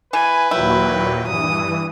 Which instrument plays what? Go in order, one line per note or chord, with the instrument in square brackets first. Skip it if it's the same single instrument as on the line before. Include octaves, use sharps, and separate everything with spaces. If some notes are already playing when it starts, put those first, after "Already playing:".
[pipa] E3 [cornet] B4 [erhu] G#5
[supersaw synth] D#2 A#2 F#3 [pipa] E4 [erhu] G5
[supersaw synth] G2 E3 [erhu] D#6